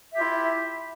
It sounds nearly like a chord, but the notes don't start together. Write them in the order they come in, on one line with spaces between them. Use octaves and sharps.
E5 G4 F4 E4